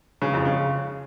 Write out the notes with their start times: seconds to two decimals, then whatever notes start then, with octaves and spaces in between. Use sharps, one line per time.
0.22 C#3
0.33 F2
0.45 C#3